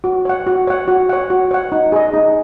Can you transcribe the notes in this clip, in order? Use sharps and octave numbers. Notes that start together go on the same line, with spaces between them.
F#4
C#5 F#5
F#4
C#5 F#5
F#4
C#5 F#5
F#4
C#5 F#5
D#4
G#4 D#5
D#4